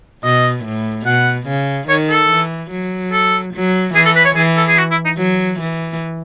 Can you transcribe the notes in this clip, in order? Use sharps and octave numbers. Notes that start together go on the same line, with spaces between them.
B2 D#5
A2
B2 F#5
C#3
D#3 C#5
A4
E3
F#3
A4
F#3
E3 G#4
A4
B4
C#5
E3 G#4
A4
G#4
F#4
E4
D#4
F#3
E3